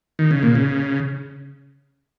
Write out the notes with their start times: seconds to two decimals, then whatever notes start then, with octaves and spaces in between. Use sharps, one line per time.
0.19 D#3
0.31 C#3
0.43 A#2
0.55 C#3